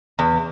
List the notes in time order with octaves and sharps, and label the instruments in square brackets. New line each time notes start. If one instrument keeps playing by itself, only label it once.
[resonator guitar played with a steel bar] E2